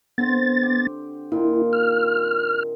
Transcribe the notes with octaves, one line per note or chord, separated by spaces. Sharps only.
D3 B3 C4 C6 A6
G4
A#2 D#3 E4 F4
F6